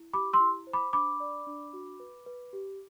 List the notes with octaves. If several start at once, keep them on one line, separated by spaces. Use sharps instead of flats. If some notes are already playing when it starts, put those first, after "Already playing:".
Already playing: E4
G4 B5 D6
C6 E6
E4
C5
B5 D6
D4 B5 D6
D5
D4
F#4
B4
B4
G4